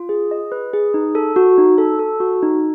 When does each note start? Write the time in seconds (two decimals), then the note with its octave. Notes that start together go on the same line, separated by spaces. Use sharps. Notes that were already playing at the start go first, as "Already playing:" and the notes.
Already playing: F4
0.09 G#4
0.31 D#5
0.52 B4
0.73 G#4
0.94 D#4
1.15 A4
1.36 F#4
1.58 D#4
1.78 A4
1.99 A4
2.20 F#4
2.42 D#4